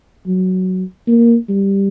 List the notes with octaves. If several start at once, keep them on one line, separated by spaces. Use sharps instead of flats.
F#3
A#3
G3